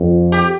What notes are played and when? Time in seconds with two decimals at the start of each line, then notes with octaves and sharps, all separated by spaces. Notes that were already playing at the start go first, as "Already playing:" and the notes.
Already playing: F2
0.32 G4